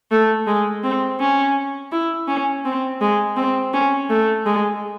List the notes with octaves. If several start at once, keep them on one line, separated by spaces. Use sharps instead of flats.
A3
G#3
C4
C#4
E4
C#4
C4
G#3
C4
C#4
A3
G#3